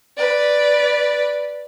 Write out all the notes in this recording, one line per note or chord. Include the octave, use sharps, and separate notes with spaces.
B4 D5